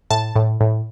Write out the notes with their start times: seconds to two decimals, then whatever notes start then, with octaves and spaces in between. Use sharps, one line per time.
0.10 A2 A5
0.36 A2
0.61 A2